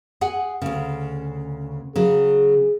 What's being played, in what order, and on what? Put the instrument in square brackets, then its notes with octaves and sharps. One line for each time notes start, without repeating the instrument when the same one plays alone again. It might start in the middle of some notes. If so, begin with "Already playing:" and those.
[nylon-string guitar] G#4 F#5 G#5
D2 C#3
[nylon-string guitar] C#3 F#3 [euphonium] G#4